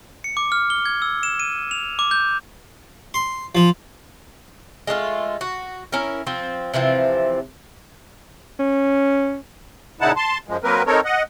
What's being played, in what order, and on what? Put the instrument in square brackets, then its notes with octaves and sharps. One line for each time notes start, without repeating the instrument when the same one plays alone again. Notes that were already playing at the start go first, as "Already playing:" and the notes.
[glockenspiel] C#7
D6
F6
G7
G#6
E6
E7
D#7
F7
D6
G6
[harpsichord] C6
F3
[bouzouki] G#3 A3 D4 F4
F#4
C#4 E4 A#4
F3 C4
C3 E3 F3 C4
[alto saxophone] C#4
[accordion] A#2 C#3 D#4 E4 F#5 A5
A5 C6
F#2 F3 G#3
F#3 A#3 C4 A#4 B4
C4 D#4 A4 A#4 C#5
D#5 F#5